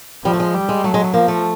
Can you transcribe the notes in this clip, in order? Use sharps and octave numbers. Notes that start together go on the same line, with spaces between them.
F3 G3
A3
G#3
G3
G#3
F#3 A3
G#3
A3
F3 A#3
A3